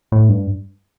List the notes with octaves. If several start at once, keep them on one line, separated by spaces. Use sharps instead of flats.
A2
G2